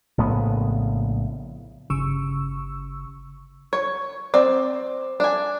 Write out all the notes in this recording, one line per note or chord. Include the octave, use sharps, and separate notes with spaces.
A#1 A2 C#3 B3
G1 C#3 C#6 E6
C#5
C4 D5
D4 G#5